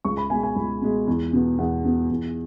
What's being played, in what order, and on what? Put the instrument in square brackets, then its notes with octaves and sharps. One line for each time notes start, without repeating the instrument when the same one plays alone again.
[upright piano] C#2 C#6
B5
B2 G#3 G#5
G#5
C#2
B2 G#3
E2
B2 B3
E2 F#5
B2 B3
E2